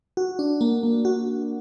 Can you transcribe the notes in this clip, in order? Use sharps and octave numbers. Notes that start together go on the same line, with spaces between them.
F#4
D4
A#3
A#3
F#4